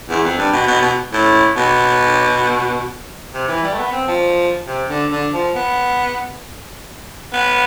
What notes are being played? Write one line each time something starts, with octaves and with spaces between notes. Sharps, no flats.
E2
F2
G2
B2
B2
B2
A2
B2
C3
E3
G3
A3
B3
C4
F3
C3
D3
D3
F3
B3
B3